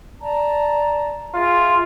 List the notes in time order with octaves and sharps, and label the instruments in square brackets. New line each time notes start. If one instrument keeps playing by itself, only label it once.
[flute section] D5 A5 A#5
[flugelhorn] F4 [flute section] G#4 E5 C6